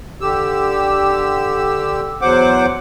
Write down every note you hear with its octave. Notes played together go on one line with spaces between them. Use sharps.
D3 G4 E6
E2 F#3 C5 F#5 D6